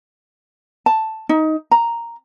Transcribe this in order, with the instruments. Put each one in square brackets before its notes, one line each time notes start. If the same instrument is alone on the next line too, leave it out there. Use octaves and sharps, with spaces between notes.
[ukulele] A5
D#4
A#5